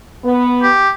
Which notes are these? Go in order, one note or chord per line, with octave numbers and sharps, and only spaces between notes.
B3
G4